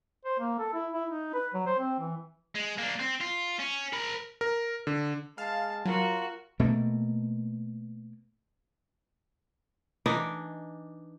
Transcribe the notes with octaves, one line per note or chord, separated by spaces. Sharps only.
C5
A#3
A4
E4
E4
D#4
B4
F#3
C5
C4
E3
G#3
A#3 D4
C4
F4
C#4
A#4 B5
A#4
D3
G#3 F5 A5
F#3 F4 F#4 A#4
B2 A3 A#3
E3 D4 D#4